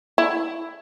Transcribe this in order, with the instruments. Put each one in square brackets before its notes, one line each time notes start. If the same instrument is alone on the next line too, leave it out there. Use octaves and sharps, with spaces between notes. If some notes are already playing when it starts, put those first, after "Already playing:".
[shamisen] E4